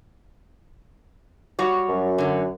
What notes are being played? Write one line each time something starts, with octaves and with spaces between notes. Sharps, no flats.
G3 F#4 C#5
F#2
D3 F#3